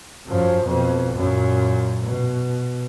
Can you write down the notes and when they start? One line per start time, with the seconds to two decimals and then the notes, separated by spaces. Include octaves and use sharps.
0.27 F#2 F3
0.64 F2 B2
1.14 F#2 A#2
2.02 B2